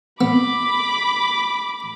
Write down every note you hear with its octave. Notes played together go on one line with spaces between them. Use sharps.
B3 B5 D6